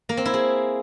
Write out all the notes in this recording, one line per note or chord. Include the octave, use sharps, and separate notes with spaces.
A#3
C4
E4
G#4